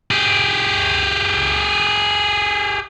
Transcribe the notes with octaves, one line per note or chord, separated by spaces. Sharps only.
G4 G#4